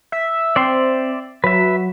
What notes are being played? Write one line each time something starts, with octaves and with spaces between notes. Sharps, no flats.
E5
C4 D5 E5 C6
F#3 B4 E5